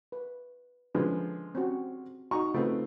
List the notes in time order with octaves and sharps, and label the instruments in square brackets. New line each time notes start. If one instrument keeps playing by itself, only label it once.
[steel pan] B4
[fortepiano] D3 F3 G#3 [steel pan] C#4 B4
[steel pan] C4 C#4 F#4
[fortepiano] D#4 A#5 C#6 [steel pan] F#4
[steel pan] C#3 F4 B4 [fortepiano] A3 C4 D#4